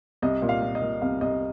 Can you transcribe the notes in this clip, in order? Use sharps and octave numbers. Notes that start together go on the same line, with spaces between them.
C2 D#5
A#2
F5
A#2
D#5
A#2
C2 F5
C2 D#5